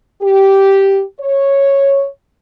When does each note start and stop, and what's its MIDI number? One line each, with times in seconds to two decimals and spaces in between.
0.22 1.01 67
1.19 2.06 73